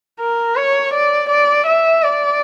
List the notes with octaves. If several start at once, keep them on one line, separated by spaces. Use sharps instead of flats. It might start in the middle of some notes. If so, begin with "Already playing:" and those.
A#4
C#5
D5
D5
E5
D5